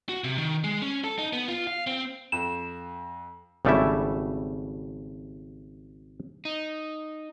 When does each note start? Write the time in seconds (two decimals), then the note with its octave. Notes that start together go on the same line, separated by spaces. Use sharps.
0.09 F#4
0.24 C3
0.38 D#3
0.64 G#3
0.82 C#4
1.04 A4
1.19 D#4
1.33 B3
1.48 F4
1.67 F5
1.87 C4
2.32 F2 E7
3.65 G#1 C#3 G3 A3 E4 E5
6.45 D#4